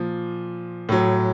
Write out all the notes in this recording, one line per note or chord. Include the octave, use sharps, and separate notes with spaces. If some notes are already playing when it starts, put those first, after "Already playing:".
Already playing: A#2 F3
A2 F#3